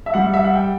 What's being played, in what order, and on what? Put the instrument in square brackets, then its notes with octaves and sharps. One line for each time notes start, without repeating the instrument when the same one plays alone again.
[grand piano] E5
G3 F#5
E5
F#5
G5